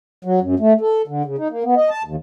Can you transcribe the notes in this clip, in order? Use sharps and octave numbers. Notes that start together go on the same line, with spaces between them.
F#3
F#2
A3
A4
D3
C#3
D#4
A#3
B3
D#5
A5
D#2